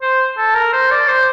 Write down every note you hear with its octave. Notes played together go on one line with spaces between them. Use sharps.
C5
A4
A#4
C5
D5
C5